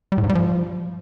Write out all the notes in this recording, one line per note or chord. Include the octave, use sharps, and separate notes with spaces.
G3
A2
G#2
G3
F3